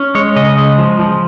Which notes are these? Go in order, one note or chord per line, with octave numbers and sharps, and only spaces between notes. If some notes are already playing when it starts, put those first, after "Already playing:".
Already playing: C#4
G#3 C#5
C#3 D#5
G#3
F3
F3